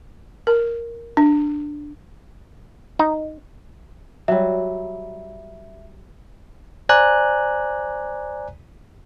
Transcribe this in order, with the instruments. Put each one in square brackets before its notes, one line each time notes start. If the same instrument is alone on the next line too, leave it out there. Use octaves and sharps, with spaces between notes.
[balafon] A#4
D4
[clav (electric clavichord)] D#4
[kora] F#3 G3 [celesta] E5
[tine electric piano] C5 D5 G#5 A#5 F#6